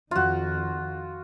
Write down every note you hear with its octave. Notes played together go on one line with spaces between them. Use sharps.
F2 D#3 F4 F#4